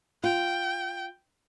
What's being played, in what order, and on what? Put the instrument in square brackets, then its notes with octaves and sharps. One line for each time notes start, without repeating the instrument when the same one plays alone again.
[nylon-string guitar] F4 [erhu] G5